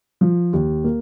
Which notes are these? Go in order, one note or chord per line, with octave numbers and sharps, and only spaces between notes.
F3
D#2
A#3